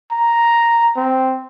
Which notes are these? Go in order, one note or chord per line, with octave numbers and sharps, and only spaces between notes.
A#5
C4